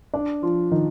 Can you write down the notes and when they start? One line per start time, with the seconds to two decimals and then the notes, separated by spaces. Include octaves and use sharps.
0.14 D4 D5
0.42 F3 F4
0.71 D#3 D#4